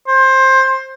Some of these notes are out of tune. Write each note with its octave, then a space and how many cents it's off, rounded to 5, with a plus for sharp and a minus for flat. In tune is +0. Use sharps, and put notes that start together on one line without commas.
C5 +20